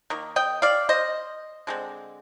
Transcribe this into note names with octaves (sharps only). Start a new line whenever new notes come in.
D#3 A#3
D#5 G5
D5 F5
C5 D#5
D3 G#3 C4